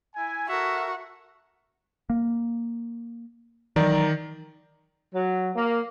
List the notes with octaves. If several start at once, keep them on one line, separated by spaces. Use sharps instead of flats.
E4 G#5
F#4 A4 A#4 E5
A#3
D#3 E3 F#3 D5 A#5
F#3
A#3